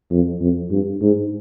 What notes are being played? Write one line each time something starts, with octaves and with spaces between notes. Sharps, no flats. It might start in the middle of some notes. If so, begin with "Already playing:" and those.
F2
F2
G2
G#2